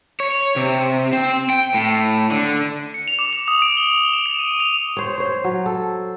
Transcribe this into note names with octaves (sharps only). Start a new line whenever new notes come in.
C#5
C3
C4
G5
A2
D3
C#7
F7
D6
F7
D#6
D7
G7
F7
E7
D7
D#7
F7
C5 C#5
C5 C#5
F#3
A4